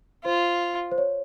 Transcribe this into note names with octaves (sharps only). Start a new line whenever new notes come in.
F4 C5
C5
C#5